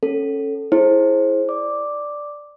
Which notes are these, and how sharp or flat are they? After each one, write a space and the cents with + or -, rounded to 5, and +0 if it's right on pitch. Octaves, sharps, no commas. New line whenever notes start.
C#4 -15 A4 +0
E4 +0 G#4 +30 C5 +25
D5 +0 D6 +0